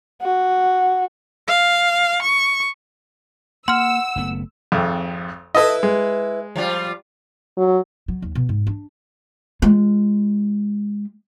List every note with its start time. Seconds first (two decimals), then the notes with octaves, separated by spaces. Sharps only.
0.22 F#4
1.47 F5
2.22 C#6
3.68 A#3 F#5 C6 E6 F6
4.16 F#1 A3 B3
4.72 G#1 F2
5.55 E4 A4 B4 D#5
5.83 G#3
6.56 F3 G3 F4
7.57 F#3
8.08 F#3
8.22 D#2
8.35 B2
8.49 G#2
8.67 D4
9.62 G#3 F4